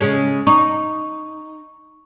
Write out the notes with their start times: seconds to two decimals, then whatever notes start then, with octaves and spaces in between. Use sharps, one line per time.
0.01 C#3 G#3 C#4
0.47 D#4 C#6